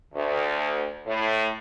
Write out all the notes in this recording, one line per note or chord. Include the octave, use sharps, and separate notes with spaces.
D2
A2